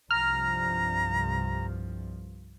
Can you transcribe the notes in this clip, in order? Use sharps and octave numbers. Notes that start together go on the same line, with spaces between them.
C2 G2 F3 A#5 F6